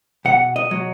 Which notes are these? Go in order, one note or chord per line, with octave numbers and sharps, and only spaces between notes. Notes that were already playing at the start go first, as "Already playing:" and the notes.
B2 F#5
D#5
F#3